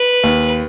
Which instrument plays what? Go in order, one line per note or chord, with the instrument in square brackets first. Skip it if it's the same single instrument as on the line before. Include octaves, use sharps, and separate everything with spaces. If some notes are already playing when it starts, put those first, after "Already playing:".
Already playing: [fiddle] B4
[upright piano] D#2